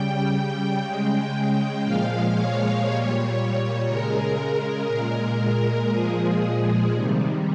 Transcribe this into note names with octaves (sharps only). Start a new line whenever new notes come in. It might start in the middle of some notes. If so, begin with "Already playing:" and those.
Already playing: C#3 G3 G5
G5
C#3 G#3 G5
A#2 F3 G#3 F5
C#5
A#2 G3 C#5
C#3 G#3 A#4
A#2 G#3 A#4
A#2 F3 G#3 G#4
C3 D#3 G3